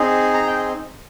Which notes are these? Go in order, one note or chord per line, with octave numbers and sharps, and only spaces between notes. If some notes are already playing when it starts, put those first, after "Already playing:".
Already playing: C4 D#4 G#4
A#5
G5